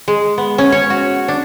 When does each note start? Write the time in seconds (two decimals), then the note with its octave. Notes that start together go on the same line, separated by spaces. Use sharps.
0.08 G#3
0.38 B3
0.58 C#4
0.72 C#5
0.90 F#4
1.28 D4